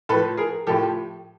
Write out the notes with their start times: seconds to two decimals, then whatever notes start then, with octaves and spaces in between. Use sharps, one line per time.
0.09 A2 A4 B4
0.14 F3
0.37 G#4 A#4
0.67 A2 F3 G4 A4